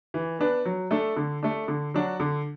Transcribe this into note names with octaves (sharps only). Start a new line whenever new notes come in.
E3
B3 D4 B4
F#3
A3 D4 A4
D3
A3 D4
D3
F#3 D4 F#4
D3